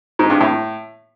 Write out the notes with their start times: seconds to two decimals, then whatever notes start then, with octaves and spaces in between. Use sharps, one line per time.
0.19 G#2
0.30 G2
0.41 A2